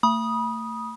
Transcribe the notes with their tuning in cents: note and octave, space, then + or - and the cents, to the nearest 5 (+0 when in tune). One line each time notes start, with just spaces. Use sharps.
A3 +40 B5 -30 D#6 +0